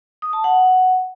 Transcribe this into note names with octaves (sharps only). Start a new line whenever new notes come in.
D#6
A5
F#5